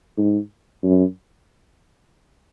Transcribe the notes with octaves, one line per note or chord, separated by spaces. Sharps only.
G#2
F#2